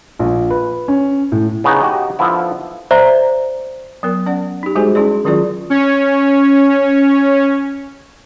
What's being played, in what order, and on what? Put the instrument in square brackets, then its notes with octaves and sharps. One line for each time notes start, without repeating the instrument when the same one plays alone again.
[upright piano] A#1
B4
C#4
A2
[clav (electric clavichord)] C#3 B3 C#4 D#4
F#4 G4 D#5
D3 F3 B3 E4
[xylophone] C5 D5 E5 A#5
[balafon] F#3 B3 A#4
C#4 D5 F#5
D#4 G4
G3 G#3 F#4 G#4 C5 G#5
C#4 E4 G#4 D5
D#3 F#3 C#4 F4 G#4 D5
[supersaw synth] C#4 C#5